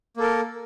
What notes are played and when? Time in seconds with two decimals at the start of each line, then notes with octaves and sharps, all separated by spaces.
0.17 A#3
0.20 A4
0.23 A#4